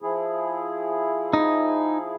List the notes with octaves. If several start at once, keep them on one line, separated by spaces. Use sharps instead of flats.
F3 E4 G#4
D#4